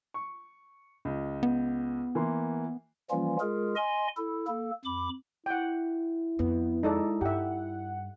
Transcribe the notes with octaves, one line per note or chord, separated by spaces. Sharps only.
C#6
C#2
B3
E3 A#3 C6
E3 F3 G3 A#3 C#4 F4
G#3 F4 G#4 A#4
D#5 G#5 C6
E4 A4
A#3 A4
F2 B5 D6
E4 F#5 G5
F2 B3
G#3 D#4 A4 D5
G2 G4 E5 F#5